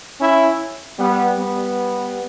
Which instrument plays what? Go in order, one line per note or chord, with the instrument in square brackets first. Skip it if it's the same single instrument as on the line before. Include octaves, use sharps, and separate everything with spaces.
[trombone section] C#4 E4
G3 B3
G3 B3